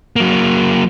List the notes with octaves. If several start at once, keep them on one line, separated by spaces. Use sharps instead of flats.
F#3 A#3